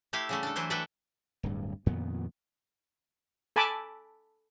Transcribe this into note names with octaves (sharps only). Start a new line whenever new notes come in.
A3 E4 G4 E5 F5
C#3 G3 A3
D4 A4
E3 F#3 E4 C5
A4 B4 D5 E5 F#5 G5
D1 G2
F2 A#2 D#3 B3
A4 G#5 A5 B5 D6